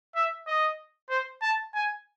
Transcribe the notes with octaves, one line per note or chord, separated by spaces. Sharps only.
E5
D#5
C5
A5
G#5